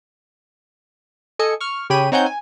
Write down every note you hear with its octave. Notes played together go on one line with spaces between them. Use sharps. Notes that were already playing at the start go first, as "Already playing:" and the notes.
A4 D#5 G#5 C#7
C#6 F6
C#3 G4 C#5 G5 B5 D#7
C4 D#4 C#5 F#5 G#5 G6
G#5